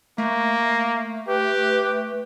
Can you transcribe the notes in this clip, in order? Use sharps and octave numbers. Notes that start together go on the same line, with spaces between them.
A3 A#3
G4 B4